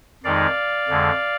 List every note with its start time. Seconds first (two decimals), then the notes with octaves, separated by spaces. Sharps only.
0.24 F2 D#3 G#3 D#4 D5 F5
0.88 F2 D3 G#3